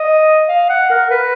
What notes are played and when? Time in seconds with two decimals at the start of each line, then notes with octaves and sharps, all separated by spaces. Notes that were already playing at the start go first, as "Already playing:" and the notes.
Already playing: D#5
0.48 F5
0.69 F#5
0.90 A#4
1.11 B4